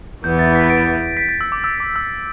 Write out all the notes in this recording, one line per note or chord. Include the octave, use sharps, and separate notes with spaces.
E2 E3 B3 G6
A6
B6
D7
B6
A6
E6
D6
E6
D6
E6